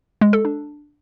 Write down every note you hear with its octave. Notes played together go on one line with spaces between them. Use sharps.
G#3
A4
D4